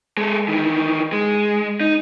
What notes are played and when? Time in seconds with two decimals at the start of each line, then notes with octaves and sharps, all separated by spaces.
0.18 G#3 A4
0.48 D#3 E3
1.12 G#3
1.80 D#4